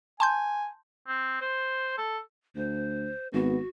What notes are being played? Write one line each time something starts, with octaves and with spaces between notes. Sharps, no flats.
G#5 A5 C6 G6
C4
C5
A4
D2 C5
G#1 B3 F#4